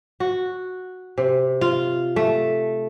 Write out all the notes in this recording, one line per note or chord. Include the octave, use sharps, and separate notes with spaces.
F#4
C3
F4
A3